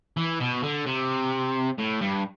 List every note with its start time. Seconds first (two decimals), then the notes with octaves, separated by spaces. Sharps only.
0.17 E3
0.40 B2
0.62 D3
0.86 C3
1.79 A2
2.01 G2